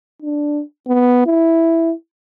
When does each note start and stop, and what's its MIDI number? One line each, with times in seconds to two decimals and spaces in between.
0.22 0.62 62
0.87 1.26 59
1.26 1.93 64